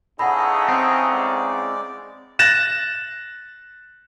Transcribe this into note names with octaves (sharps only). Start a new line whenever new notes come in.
E2 C#3 D#4 G#4 A4 D#5 F#5 B5
C4
G#3 D5
F#6 A6 A#6 E7